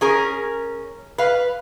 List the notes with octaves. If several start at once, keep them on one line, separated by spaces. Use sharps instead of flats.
C#4 G#4 A#4
B4 F5